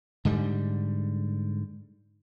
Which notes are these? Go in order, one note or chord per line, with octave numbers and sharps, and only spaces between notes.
G#2 D3 G3